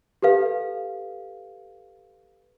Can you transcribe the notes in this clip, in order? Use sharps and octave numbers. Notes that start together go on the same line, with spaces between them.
G4 A4 B4 F5